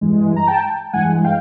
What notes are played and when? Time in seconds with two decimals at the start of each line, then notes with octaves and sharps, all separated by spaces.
0.01 G2 E3 G#3
0.36 A#5
0.47 G5 A5
0.93 G2 E3 G#3 F#5 G#5
1.24 F5 G5